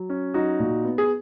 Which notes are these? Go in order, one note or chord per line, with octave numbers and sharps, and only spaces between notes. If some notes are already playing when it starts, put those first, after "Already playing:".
Already playing: F#3
C#4
F#3 D#4 F#4
A#2
B3
G#4